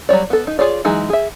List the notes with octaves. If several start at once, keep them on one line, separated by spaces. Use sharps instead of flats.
F#3 G3 C#5 D5
B3 A4
D#4
F4 G#4 C#5 D5
E3 F#3 G#3 D#4 G#4
G#4 E5